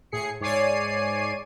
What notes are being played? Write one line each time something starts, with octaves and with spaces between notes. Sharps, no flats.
A2 G#4 C7 C#7
G#2 C#5 D5 G#5 C7 D#7